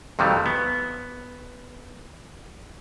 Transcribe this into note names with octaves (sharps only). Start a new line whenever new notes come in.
F2 C3 D#3 F#3 G3 A3
B3